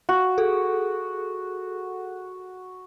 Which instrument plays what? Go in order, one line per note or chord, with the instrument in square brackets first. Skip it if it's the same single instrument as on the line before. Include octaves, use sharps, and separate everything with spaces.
[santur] F#4
[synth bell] G#4 A4